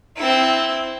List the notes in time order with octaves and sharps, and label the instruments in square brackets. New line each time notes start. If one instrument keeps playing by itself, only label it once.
[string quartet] C4 E4